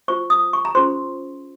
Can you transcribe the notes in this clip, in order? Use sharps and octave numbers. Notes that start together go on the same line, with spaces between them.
F4 C5 C#6
D#6
C#6
A#5
C#4 F4 G#4 C5 C6